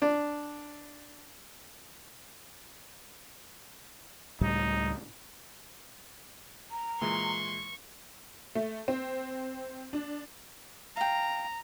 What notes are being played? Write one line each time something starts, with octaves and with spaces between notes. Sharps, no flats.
D4 D5
C#2 A2 G3 D#4
A#5
A#2 E3 G#3 C6 C#6
A3
C4
D4
F5 G5 A#5